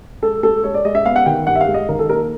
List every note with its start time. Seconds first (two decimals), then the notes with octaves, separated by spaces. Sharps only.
0.22 G#3 A4
0.43 G#3 A4
0.63 G#3 C#5
0.74 D5
0.85 G#3 D#5
0.95 E5
1.05 B3 F5
1.16 F#5
1.26 D#3 G5
1.47 G2 F#5
1.55 E5
1.61 F5
1.68 G#3
1.74 D#5
1.89 D#3 A#4
1.99 A4
2.09 A#3 A#4